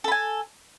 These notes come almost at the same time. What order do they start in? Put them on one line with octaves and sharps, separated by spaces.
A4 B5 G#5